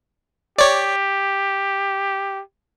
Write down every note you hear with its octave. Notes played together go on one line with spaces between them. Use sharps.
G4 C#5 D5